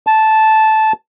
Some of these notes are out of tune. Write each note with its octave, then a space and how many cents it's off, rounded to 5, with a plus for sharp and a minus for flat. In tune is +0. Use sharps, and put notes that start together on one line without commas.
A5 -10